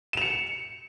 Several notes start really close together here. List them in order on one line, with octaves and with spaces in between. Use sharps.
E7 F7 C#7